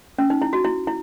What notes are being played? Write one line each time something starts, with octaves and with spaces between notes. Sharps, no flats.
C#4
D#4
E4
F#4
E4
E4